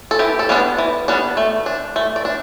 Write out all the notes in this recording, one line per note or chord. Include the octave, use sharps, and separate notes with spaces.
A4
E3 G4
A4
G3 B3 D4
E3
G3 B3 D4
A3
D4
A3
D5
D4